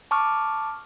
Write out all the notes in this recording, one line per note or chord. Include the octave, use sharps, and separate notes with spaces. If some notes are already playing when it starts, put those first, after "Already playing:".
A5 C#6 D6 F6